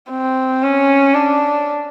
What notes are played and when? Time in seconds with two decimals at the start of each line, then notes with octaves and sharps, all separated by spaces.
0.10 C4
0.63 C#4
1.13 D4